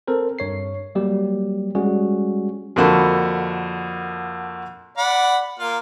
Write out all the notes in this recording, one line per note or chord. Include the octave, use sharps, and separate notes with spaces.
C4 A4 A#4 C5
G2 C#5 C7
F#3 G3 A#3 G4
G3 G#3 C#4 F#4 G#4
F2 D3 A#3 F#4 A4 B5
D5 F#5 B5
A#3 F4 F5